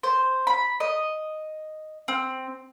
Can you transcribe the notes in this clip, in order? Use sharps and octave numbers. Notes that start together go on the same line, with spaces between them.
C5
B5
D#5
C4